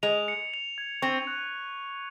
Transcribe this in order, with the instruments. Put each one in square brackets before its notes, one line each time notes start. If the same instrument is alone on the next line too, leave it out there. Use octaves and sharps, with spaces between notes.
[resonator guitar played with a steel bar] G#3 [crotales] F7
[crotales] C#7
F7
G#6
[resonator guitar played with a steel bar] C4 [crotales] C#6
[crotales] F#6